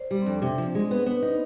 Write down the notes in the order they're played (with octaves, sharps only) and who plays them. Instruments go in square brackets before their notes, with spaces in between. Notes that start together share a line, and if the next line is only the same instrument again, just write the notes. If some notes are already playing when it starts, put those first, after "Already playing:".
Already playing: [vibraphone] C5 D5
[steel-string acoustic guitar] G3
[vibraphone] C4
[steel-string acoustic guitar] F2 [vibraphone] D4
[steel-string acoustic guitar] C3
F3
G#3
B3
B3
D#4